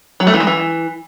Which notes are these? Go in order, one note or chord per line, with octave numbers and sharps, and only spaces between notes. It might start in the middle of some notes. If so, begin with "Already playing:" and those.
F#3
A3
E3
G#3
E3